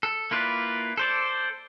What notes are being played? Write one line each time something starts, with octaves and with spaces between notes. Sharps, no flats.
A4
A#3 E4 F4 B4 D5
A4 C5 D5